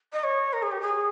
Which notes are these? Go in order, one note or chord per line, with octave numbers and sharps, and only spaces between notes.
D#5
C#5
A#4
G#4
G4
G#4